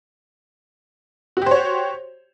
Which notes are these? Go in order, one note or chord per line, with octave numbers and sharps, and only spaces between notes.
F#4 G4 C5 C#5